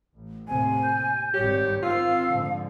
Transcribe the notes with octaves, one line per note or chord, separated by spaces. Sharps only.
A1
D#2 A2 C3 G#5
G6
G#1 G2 G3 G4 C#5
D#3 C4 F4 F5 E6
G#2 D3 F3